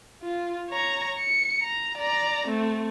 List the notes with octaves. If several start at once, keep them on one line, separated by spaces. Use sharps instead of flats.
F4
C#5 A#5
C#7
A#5
D5 A#5
A3 C4